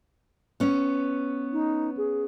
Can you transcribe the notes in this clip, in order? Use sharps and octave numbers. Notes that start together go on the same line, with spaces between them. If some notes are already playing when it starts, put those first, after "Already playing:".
B3 C#4
D#4
G#4